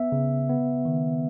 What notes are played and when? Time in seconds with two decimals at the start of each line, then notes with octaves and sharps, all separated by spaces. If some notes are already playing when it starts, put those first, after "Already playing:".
Already playing: B3 E5
0.12 C#3
0.49 B3
0.85 D#3